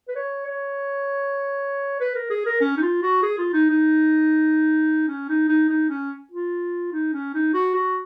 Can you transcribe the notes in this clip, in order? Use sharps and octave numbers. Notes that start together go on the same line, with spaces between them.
B4
C#5
C#5
B4
A#4
G#4
A#4
C#4
D#4
F4
F#4
G#4
F4
D#4
D#4
C#4
D#4
D#4
D#4
C#4
F4
D#4
C#4
D#4
F#4
F#4